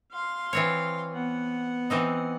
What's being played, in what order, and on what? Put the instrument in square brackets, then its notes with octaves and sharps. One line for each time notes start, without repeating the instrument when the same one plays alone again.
[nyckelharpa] F5 C6
[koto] E3 C4 C#5
[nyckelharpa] B3 F#5
[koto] E3 C4 D#4